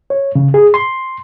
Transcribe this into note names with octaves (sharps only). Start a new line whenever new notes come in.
C#5
C#3
G#4
C6